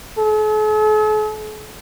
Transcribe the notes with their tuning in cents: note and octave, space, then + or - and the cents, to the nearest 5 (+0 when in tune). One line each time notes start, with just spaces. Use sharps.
A4 -45